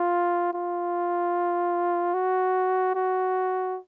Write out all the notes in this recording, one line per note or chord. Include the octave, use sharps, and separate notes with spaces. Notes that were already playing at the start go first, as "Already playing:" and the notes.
Already playing: F4
F4
F#4
F#4